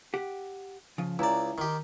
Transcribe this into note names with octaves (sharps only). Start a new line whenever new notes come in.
G4 F#5
C#3 F3
C#2 E4 D5 G#5 A#5
D#3 G4